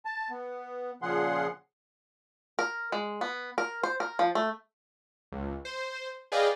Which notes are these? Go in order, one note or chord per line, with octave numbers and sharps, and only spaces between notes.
A5
B3
A#2 C#3 F3 G#4 F#5 C6
A#4
G#3
B3
A#4
C5
A#4
F3
A3
C#2
C5
G#4 B4 D5 D#5 F5 G5